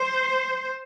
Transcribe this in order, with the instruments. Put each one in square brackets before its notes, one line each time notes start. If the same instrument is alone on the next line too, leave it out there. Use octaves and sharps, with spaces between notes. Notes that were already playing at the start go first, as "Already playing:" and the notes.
Already playing: [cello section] C5